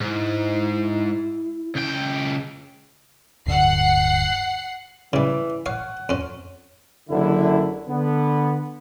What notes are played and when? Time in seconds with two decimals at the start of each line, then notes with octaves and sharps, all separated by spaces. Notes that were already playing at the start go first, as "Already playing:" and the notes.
0.01 G#2 E4
1.75 C#2 G5
3.46 D1 G2 D3 F#5 C7
5.13 C#3 E3 G3
5.66 C#5 F5 F#5
6.09 F2 C#4
7.09 F#1 D3 E4
7.88 D3 B3